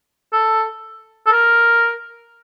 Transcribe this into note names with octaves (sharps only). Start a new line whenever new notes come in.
A4
A4
A#4